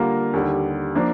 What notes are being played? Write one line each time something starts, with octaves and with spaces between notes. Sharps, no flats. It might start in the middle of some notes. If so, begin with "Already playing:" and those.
Already playing: D3 G3 A#3 F4 A#4
D#2 D3 G3
F3 A#3 D4